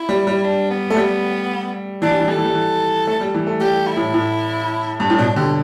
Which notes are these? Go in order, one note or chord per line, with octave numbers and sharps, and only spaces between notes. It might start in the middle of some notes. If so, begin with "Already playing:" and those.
Already playing: E4
G3
G3
D4
B3
A3
G3
E3 D4
G3
E3
G3 A4
E3
G3
E3
A3
G3
E3
A3
G3 G4
E4
A2
A2
G2
A2
B2 D4
D3 G4